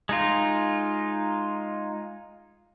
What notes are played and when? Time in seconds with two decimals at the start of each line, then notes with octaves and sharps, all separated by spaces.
0.09 G#3 D#4 F4